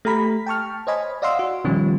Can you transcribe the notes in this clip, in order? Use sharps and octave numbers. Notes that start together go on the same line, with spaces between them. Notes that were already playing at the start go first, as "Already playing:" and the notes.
A3 G4 A#5 B5 B6
G5 A5 C#6 F6
C5 C#5 D#5 G#5 B5
D5 D#5 F5 F#5 C6 E6
F#4
B2 D#3 F3 G3 C#4